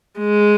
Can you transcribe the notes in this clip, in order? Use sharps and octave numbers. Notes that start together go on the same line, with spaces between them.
G#3